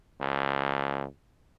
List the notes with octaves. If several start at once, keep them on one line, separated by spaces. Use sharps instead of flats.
C#2